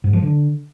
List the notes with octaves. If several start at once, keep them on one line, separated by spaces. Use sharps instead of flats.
G#2
F3
D3